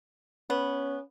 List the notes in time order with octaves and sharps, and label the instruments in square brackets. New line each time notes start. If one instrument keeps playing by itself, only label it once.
[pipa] B3 [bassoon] C#4